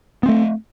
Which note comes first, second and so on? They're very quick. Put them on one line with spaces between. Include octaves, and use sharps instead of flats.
B3 C4 A3